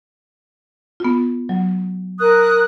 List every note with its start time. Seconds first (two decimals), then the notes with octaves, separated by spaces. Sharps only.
1.00 B3 F4
1.49 F#3
2.19 A#4 D#6 F#6